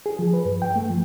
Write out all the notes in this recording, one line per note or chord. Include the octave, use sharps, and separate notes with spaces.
G#4
F3
B4
G2
G5
A3
F3